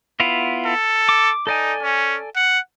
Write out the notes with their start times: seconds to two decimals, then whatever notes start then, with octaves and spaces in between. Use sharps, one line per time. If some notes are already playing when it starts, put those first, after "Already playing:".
0.20 B3 E4 F4
0.66 A4
1.09 D6
1.47 D#4 A4 D5 G#5
1.83 C#4
2.36 F#5